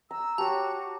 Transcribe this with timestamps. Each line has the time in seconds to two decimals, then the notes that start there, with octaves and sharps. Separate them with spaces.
0.11 A#5 E6
0.38 F#4 G4 C#5 A5